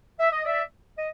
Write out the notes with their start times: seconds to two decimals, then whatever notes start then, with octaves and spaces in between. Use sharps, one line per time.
0.20 E5
0.32 D#5
0.45 D5 E5
0.97 D#5